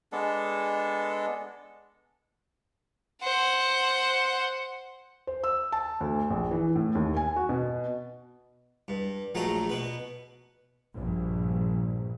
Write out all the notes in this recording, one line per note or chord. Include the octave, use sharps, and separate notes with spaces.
G#3 B3 D4 A4
C5 F#5
C5
E6
A5
D2
A#1
E3
A2
D#2
G#5
F#4
B2
G2
A#1 F#3 A3 G#4 A#5
B2 B4
A#1 G2